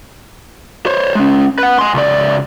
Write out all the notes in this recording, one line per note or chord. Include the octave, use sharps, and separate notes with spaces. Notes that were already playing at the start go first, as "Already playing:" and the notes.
C5 C#5
G#3 C#4
B4 F#5
G#5 C6
C#2 D5